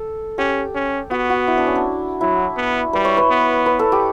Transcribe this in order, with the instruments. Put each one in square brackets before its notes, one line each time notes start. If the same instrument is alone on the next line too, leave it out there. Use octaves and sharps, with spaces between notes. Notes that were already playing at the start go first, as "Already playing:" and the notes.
Already playing: [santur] A4
[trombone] C#4 [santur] G4
[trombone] C#4
[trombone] B3 [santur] F#4
[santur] F#4
E4
D4
C#4
D4
[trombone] F#3 [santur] E4
[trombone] B3
[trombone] G3 [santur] B4
[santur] C#5
B4
[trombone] B3
[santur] B4
A4
G4